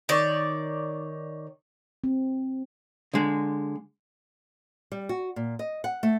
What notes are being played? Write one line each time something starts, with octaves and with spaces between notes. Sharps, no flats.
D#3 C#5 D5
C4
D3 G#3
G3
F#4
A#2
D#5
F#5
A3